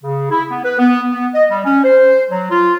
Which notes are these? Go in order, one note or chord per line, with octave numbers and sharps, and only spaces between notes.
C#3
E4
B3
B4
B3
B3
D#5
G3
C#4
C5
F#3
F4